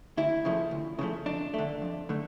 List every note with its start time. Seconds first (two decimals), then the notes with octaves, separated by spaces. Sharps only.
0.17 D2 E4
0.45 C#3 F3 A3
0.71 D2
0.99 C#3 F3 A3
1.26 F2 D4
1.54 D3 A3
1.82 F2
2.09 D3 A3